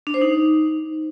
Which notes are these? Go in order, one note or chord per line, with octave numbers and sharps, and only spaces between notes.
D4
C5
D#4